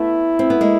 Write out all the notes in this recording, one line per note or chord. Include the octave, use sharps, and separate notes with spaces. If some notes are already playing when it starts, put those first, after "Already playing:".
Already playing: A3 B3 E4
C4
B3
G#3 A#3